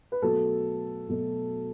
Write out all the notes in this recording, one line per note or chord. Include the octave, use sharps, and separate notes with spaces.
B4
B2 F#3 A3 A4
B2 F#3 A3